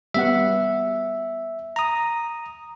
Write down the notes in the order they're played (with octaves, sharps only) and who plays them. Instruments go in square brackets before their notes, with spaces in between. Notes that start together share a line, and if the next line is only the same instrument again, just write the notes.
[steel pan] G3 B3 F#5 [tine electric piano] E5
[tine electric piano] A#5 D#6